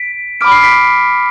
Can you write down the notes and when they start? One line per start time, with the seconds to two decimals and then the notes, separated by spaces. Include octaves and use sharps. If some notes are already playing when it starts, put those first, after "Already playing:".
Already playing: B6 D7
0.41 B5 D6 F6 D7
0.52 C7
0.63 B6 D7